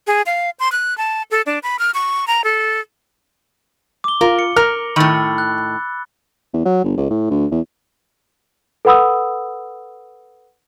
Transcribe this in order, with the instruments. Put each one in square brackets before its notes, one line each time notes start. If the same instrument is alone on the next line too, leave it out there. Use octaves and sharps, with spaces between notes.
[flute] G#4
F5
C6
F#6
A5
A4
D4
B5
F6
C#6
A#5
A4
[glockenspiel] D6 G7
[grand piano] F4 [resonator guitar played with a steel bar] A#4
[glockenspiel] C#7
[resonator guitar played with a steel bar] A#4 [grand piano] F6
[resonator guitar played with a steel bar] A2 D#3 [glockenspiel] B5 E6 A6
[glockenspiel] F#6
[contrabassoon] E2
F#3
G1
C#2
A2
D2
E2
[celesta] A4 B4 F#5 B5 D#6 E6